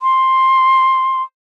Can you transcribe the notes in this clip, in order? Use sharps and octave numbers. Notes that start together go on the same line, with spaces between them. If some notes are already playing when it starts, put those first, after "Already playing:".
C6